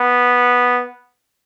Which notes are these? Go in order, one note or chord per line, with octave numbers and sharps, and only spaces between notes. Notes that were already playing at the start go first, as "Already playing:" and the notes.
Already playing: B3